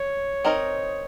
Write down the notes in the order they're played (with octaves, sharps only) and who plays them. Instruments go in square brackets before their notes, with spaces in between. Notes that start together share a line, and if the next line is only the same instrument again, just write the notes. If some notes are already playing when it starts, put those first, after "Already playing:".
Already playing: [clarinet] C#5
[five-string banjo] C4 D#4 A#4 D#5